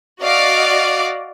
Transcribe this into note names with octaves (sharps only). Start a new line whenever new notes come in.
F#4 D5 D#5 F5 D6